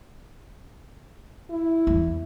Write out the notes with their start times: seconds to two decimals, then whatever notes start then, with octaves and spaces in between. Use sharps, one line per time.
1.50 E4
1.87 E2